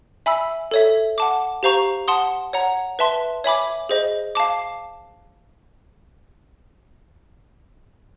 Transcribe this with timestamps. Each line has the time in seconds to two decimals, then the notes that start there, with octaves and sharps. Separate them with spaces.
0.26 E5 G#5 B5 E6
0.71 A4 C#5 E5
1.18 F#5 A5 D6
1.63 G4 C5 F5 A#5 C#6
2.08 F#5 A5 C6 D#6
2.53 C#5 F#5 A#5
2.99 B4 E5 A5 C6
3.44 C#5 E5 G#5 B5 D6
3.89 G#4 C5 D#5
4.35 F5 A5 D6